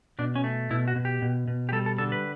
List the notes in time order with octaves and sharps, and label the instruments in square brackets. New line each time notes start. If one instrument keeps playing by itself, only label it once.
[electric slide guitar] B2 D4
C#4
A3
B2 E4
F#4
B2
G4
B2
B2
G4
G3 A4
A4
D3 A4
B4